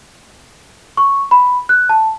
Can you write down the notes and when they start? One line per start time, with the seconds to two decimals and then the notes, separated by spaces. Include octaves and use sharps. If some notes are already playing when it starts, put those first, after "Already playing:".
0.97 C#6
1.31 B5
1.69 F#6
1.89 A5